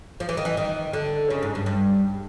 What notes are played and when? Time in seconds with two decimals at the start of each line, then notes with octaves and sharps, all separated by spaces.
0.20 F3
0.29 E3
0.37 D#3
0.45 E3
0.57 D#3
0.93 D3
1.30 C#3
1.43 G#2
1.55 G2
1.66 G2